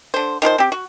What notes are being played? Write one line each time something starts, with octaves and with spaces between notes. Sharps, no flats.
D3 C5
D#3 F3 F4 C5
C4 G4
F#4